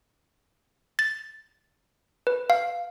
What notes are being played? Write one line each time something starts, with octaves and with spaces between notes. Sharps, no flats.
A6
B4
F5